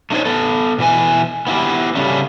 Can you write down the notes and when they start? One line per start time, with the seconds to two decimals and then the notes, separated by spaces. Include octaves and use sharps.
0.10 A3 D4 D#4 C5 C#5
0.25 B3 A4
0.78 B2 E3 G#5
1.47 B3 E4 F4 G4
1.95 C#3 G3 A3 C#4